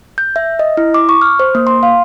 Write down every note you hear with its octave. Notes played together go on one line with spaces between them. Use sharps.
G6
E5
D#5
E4
D6
C#6
F6
C5
A#3
C6
F5